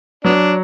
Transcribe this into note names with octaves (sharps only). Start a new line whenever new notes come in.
F#3 B3 D4